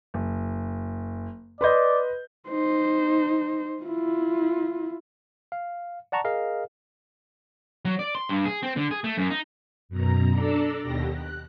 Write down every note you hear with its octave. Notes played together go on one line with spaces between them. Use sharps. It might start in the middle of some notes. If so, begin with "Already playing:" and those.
F#1
B4 D5 D#5 B5 C6 G6
D#4 C5
E4 F4
F5
D5 F#5 A5 A#5 C#6
G#4 A#4 D#5 F5
F#3
D5
C6
G2
G#4
C4
D3
G#4
A3
F#2
D#4
F#2 B2 A#5
D4 A4 D5 A#5 E6
D#2 B2 G4 A#6
F#6